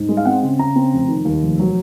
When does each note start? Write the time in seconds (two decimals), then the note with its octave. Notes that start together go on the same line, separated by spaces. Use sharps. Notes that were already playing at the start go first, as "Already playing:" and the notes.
Already playing: G#2
0.09 G#3
0.17 F5
0.25 C4 F#5
0.43 C#3
0.59 C#3 A#5
0.76 C4
0.93 F1
1.08 D#3
1.25 D#2
1.43 F1
1.60 F#3